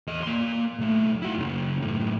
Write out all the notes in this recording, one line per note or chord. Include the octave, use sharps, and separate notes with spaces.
E2 D#5
A#3 C6
B1 A3
E4 F#4
F#2 C#3
F#2 A2